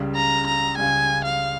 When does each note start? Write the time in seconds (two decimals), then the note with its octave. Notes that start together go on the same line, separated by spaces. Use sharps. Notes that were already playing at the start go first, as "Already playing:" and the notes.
Already playing: C#2 C#3 G3
0.15 A#5
0.47 A#5
0.77 C#2 C#3 G3 G#5
1.25 F5